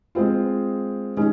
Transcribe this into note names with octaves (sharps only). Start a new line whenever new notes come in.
G#3 C4 F4
D#3 G#3 C#4